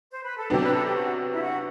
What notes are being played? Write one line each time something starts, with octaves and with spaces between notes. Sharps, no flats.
C5
B4
A4
C3 F#3 B3 D4 G4
B4
A4
G4
F#4
E4
F#4